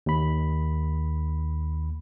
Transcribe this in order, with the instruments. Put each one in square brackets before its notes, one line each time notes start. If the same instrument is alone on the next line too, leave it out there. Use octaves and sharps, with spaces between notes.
[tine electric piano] D#2 B5